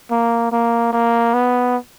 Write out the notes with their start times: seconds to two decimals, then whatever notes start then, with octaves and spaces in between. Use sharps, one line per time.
0.11 A#3
0.52 A#3
0.93 A#3
1.34 B3